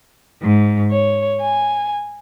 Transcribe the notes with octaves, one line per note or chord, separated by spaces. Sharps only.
G#2
C#5
G#5